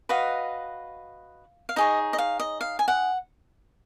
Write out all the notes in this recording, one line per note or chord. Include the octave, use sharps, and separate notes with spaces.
F#4 B4 D#5 F5
F5
D#4 G#4 C#5 D#5
D#5
F5
D#5
F5
G#5
F#5